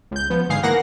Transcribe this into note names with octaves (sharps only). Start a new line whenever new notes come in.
C#2 G6
F3 B3
G#2 D3 G#4 F5 C7
E3 A#3 A#4 F#5 A#6